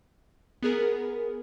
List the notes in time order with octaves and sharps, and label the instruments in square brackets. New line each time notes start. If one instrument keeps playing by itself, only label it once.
[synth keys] B3 G#4 A#4